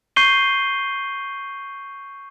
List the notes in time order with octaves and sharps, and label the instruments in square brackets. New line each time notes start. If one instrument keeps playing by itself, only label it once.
[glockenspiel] C#6 G6 C7 D#7 G7